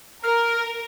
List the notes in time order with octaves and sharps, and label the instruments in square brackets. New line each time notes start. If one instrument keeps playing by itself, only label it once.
[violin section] A#4 [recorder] F6